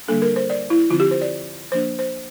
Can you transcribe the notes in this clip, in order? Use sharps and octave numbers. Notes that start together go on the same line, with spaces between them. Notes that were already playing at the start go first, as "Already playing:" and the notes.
D3 G3 A#3 D4 A4
A#4
C5
D5
E4
D3 F3 C4 F4
G4
C5
D5
F3 A#3 D4 C5
C5